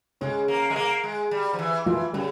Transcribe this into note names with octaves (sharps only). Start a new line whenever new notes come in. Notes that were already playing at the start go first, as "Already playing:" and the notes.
C#3 G#3 C#4
A#3
G#3
A#3
G#3
G3
F3
E3
E3 F3 F4
C#3 G3 G4